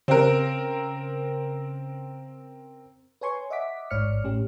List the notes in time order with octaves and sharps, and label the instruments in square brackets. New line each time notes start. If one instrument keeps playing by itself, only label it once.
[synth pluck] C#3 [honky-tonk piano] C4 A#4
[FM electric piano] B4 C#5 G#5 C6 C#6
D#5 E5 F#5 D6 B6
A1 G#2 C#5 D5 F6 C#7
A2 C#4 G4